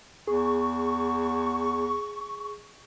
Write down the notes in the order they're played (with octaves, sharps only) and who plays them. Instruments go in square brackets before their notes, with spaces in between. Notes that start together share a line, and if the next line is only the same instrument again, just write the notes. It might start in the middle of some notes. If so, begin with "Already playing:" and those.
[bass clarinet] E2 [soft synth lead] G#4 [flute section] C#6